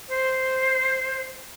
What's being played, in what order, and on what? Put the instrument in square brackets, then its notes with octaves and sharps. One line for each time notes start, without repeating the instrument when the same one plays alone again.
[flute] C5